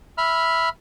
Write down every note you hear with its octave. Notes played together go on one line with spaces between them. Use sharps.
E5 B5 F6